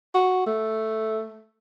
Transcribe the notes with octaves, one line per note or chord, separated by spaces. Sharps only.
F#4
A3